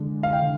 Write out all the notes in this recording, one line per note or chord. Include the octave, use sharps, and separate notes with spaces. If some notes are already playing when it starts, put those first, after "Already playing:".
Already playing: D3 G#3
F5
G5
D3